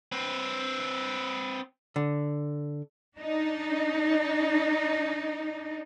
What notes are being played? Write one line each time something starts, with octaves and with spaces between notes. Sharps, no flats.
C4 B4
D3
D4 D#4